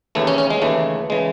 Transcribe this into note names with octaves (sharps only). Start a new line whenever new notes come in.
D#2 C#3 E3 A3
C#4
C#4
G#3
D#2 C#3 E3 A3
C#3 E3 G#3